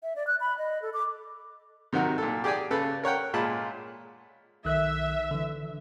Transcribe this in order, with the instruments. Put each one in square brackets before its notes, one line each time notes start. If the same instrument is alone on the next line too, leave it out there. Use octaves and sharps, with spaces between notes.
[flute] E5
D5
F#6
B5
D#5
A4
D6
[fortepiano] C3 D#3 F#3 F#4 A#4
A#2 A4
G4 G#4 D5 G5 G#5
C#3 A4 B4
A#4 C#5 F#5 G5
A#2 G#3 F4 A5 B5
[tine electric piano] B1 D#3 F#6 [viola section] E5
[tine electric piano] D3 E3